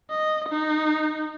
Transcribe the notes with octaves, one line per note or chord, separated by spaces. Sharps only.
D#5
D#4